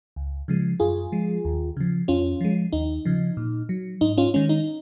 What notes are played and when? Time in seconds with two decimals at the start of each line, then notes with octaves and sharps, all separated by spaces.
0.16 C#2
0.48 C#3 F3 G#3
0.80 F#2 F4 G#4
1.12 F3 G#3
1.45 D#2
1.77 C#3 F3
2.08 F2 C#4 F4
2.41 F3 G#3
2.72 D#2 D#4
3.05 C#3 F3
3.37 A#2
3.69 F#3
4.01 G#2 D#4
4.18 C#4 F4
4.34 D#3 G#3 C#4
4.49 D#4